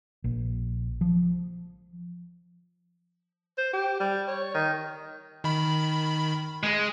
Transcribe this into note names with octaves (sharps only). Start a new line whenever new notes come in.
A#1
F3
C5
G4
G3
C#5
D#3
D#3 B5
G#3